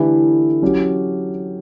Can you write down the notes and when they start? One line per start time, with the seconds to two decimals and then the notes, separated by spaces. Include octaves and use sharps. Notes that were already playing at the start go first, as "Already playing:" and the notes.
Already playing: D3 E3 A3 E4 G4
0.62 F#3 C#4 G4